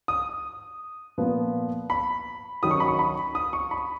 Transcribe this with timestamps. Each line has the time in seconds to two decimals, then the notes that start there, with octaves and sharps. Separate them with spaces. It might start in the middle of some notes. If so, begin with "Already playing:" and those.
0.08 D#6
1.18 A#2 F3 B3
1.90 B5
2.63 D#3 F#3 C#4 D#6
2.71 C#6
2.80 B5
2.88 C#6
2.99 B5
3.35 D#6
3.53 C#6
3.71 B5